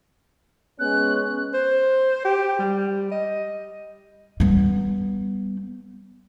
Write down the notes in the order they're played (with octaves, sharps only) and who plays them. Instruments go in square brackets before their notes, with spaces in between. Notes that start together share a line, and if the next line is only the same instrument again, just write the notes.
[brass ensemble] G#3 B3 C#4 [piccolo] F#6
[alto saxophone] C5
G4
G3
D#5
[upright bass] G3 B3